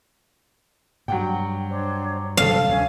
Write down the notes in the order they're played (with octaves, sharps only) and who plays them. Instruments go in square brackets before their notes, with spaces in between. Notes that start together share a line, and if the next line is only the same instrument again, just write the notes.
[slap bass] G2 [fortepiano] F#3 F#5 G5
[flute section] D4 C5 C#5
[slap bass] G1 C3 F#3 [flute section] A4 C5 [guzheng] F5
[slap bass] D2 [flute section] C#4 C#5 G#5